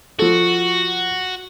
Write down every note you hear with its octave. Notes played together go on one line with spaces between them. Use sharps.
F3 F#4 A4